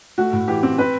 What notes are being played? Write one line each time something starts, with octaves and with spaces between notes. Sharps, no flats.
A3 F#4
A2
E3 G4
C4
C4 B4